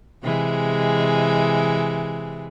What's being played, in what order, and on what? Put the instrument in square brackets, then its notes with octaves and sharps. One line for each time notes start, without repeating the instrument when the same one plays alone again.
[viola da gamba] C3 E3 G#3